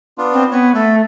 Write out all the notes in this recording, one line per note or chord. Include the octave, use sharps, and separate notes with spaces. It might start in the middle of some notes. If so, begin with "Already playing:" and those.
B3 D4 F4
C4
B3 C#5
A3 A4